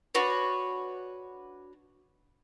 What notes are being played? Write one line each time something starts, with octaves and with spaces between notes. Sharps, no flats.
D4 F#4 B4 C#5